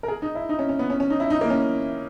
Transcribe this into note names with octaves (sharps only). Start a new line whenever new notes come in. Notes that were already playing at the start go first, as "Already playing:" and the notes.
A#4
G#4
D#4
E4
D#4
C#4
C#4
B3
C#4
C#4
D#4
E4
D#4
A#3
C#4